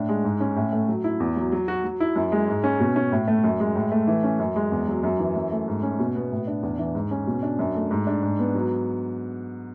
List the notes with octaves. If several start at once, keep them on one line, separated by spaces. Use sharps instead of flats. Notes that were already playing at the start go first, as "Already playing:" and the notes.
Already playing: A2 D4
G#3
G#2
C#4
A2
A3
F#3
E4
E2
F#3
F#3
F#4
F#3
E4
F#2
G#3
G#2
C#4
B2
C#4
A2
A3
F#2
G#3
A2
A3
E3
C#4
F#2
G#3
E2
F#3
F#2
E3
F#2
A3
G#2
C#4
B2
B3
A2
D4
E2
E3
G#2
C#4
B2
D4
F#2
A3
G#2
D4
G#2
B3
F#3